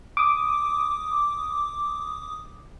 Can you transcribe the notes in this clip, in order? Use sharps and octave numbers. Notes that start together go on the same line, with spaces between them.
D6 D#6